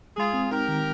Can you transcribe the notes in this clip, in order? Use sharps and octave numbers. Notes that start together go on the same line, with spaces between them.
G#3 F4 G#4
C4
D#4 G4 A#4
D#3